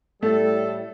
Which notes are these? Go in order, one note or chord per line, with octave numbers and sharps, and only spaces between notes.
A2 G3 A3 A4